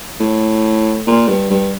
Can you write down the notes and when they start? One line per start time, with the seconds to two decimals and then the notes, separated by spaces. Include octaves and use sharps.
0.20 A2
1.07 A#2
1.28 G2
1.50 G2